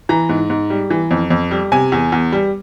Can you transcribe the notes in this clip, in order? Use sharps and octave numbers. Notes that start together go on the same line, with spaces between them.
E3 A#5
G#2
G#2
G3
E3
F2
F2
G3
C3 G#5
E2
E2
G3